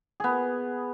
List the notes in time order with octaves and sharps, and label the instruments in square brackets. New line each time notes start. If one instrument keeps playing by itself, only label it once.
[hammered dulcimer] B3 G#4